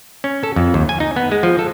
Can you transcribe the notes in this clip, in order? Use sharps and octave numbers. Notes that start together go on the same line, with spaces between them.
C#4
A4
F2
D#2
G#5
D#4
B3
G#3
F3
A4